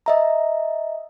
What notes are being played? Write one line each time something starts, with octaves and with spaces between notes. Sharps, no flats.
D#5 E5 A#5